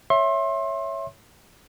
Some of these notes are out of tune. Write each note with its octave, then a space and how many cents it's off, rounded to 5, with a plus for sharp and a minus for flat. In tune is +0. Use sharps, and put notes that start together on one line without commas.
C#5 +0 E5 +0 C6 +30